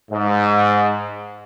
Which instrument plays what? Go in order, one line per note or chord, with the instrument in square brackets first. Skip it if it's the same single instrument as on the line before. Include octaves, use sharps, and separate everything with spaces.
[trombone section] G#2